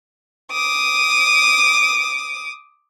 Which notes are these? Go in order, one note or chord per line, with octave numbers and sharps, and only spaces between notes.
D6 D#6